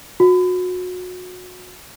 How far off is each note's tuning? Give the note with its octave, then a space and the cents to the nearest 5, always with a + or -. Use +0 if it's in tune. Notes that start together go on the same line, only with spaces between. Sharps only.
F#4 -30